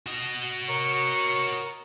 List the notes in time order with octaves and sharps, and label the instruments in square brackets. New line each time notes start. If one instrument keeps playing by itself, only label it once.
[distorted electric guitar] F#4 D#5
[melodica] A#4 [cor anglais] C#5 [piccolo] C#7